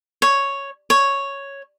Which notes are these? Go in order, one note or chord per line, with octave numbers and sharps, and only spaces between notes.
C#5
C#5